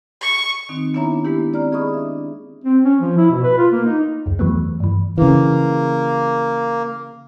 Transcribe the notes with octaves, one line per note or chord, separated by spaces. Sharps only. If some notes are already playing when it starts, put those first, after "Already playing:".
C#6
D#3 C4 D#4
B3 D4 E4 C#5 E5 A#5
G#3 A#3 B3 D4 E4 G4
C4 D5 A#5 F6
G#4 D#5 B5 C#6 D#6
D4 E5
C4
C#4
F3
E4
B2
B4
F4
A#3
D#4
C#2 F#2
E2 E3 F#3 A3 B3
G2 E3
C#3 E3 A#3